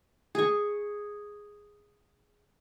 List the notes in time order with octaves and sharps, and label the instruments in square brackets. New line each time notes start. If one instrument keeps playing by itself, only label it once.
[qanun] G#4 C#6